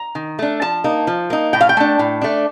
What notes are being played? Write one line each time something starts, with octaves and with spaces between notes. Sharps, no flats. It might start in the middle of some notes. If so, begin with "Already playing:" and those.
Already playing: A#5
D#3
A3 D4
F3 A5
A#3 D#4
F3
A#3 D#4
A2 G5
F5
G5
A3 D4
A2
A3 D4